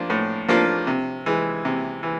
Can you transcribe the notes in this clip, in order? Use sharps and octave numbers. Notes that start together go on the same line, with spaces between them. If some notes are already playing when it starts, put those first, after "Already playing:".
Already playing: F3 A#3 D4 F4
A2
F3 A#3 D4 F4
C3
E3 G#3
C3
E3